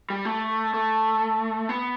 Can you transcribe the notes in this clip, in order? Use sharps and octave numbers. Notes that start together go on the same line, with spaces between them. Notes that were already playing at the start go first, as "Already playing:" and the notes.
G3
A3
A3
B3